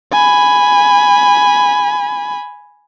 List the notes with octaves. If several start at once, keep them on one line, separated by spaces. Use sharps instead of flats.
G#5 B5